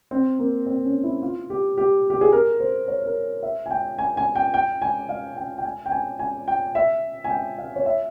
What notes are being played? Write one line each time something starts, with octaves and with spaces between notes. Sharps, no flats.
C4
A#3
C4
C#4
E4
F4
G4
G4
G4
G#4
A#4
C5
C#5
A#4
E5
G#5
G5
G#5
G#5
G5
G5
G#5
F5
G5
G5
G#5
G5
G#5
G#5
G5
E5
G#5
G5
F5
C#5
E5